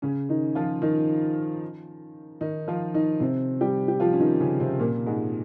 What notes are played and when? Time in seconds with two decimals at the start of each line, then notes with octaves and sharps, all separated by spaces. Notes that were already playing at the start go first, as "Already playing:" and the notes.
0.02 C#3 C#4
0.29 D#3 D#4
0.55 F3 F4
0.82 D#3 D#4
2.41 D#3 D#4
2.68 F3 F4
2.94 D#3 D#4
3.20 C3 C4
3.61 G3 G4
3.88 G4
4.00 F3 F4
4.13 C#4
4.20 D#3 D#4
4.40 C#3 C#4
4.60 C3 C4
4.79 A#2 A#3
5.06 G#2 G#3